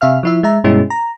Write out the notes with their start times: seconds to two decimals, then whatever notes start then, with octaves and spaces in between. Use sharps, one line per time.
0.01 C3 E5 F5 F6
0.23 F3 E4 E5
0.43 G#3 E5 A#5
0.64 G2 B2 G#3 C#4 E4
0.90 A#5